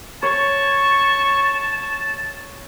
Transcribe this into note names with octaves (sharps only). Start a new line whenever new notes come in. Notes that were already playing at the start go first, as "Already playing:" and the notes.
C#5 A5 C#6